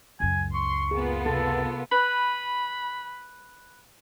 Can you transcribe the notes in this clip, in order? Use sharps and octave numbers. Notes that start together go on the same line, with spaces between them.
C#2 F#2 G#5
C6 C#6
A#3 B3 F4 G#4
C3 A4 A5
B4 B5